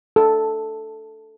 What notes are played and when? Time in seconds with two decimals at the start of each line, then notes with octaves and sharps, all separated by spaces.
0.16 A4